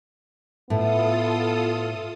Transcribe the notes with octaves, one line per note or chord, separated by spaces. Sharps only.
A2 B3 F4 A4 D#6